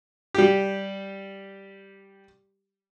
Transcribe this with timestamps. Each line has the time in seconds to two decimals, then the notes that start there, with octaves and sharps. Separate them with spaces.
0.35 G3 G4